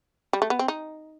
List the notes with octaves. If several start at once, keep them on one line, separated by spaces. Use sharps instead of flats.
G3
A3
B3
C4
D#4